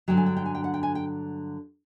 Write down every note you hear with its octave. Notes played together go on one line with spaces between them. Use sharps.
G2 D3 F#3 G5
G#5
G5
G5
G#5
G5
F#5
G5
G#5
G5